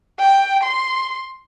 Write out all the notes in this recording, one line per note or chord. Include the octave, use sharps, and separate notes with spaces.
G5
C6